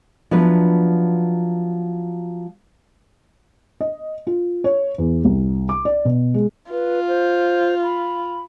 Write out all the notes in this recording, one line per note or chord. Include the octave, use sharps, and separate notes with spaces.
F3 F#3 B3 D4 E4 B4
D#5
F4
C#5
E2
C2
D6
D5
B2
G#3
F4 B4
C5
B5